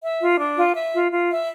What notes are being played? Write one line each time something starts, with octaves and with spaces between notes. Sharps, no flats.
E5
F4
D4
F4
E5
F4
F4
E5